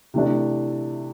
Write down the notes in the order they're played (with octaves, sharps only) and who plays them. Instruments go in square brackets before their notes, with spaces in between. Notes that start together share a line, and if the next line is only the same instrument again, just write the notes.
[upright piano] C3 E3 A3 D4